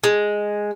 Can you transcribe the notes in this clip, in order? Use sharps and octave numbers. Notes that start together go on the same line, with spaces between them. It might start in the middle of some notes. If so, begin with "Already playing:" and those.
G#3